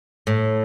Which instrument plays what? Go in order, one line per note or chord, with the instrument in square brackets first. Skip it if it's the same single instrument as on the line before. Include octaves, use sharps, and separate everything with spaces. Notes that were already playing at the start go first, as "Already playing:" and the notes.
[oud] A2